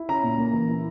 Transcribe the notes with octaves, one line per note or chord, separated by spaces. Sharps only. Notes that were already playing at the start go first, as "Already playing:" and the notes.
Already playing: E4
C#4 A#5
A#2
A#3
E3
E4